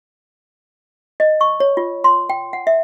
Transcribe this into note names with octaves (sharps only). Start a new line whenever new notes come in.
D#5
C#6
C#5
F4
C6
G5
F#5
E5